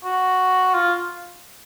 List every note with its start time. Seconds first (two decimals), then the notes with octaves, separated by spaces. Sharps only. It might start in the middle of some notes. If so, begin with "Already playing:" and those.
0.04 F#4
0.74 F4